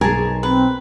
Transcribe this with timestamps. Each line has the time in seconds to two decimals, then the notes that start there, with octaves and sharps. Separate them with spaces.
0.01 B1 G#4 A#4 G#5 A5
0.43 C4 B4